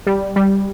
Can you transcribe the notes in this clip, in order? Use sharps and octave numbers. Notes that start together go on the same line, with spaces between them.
G3
G3